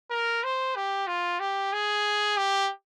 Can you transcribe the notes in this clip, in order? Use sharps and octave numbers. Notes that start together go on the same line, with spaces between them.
A#4
C5
G4
F4
G4
G#4
G4